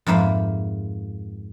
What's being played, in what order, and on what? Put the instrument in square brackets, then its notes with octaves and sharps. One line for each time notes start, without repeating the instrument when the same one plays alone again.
[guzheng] F2 G#2 A#3 E5 B5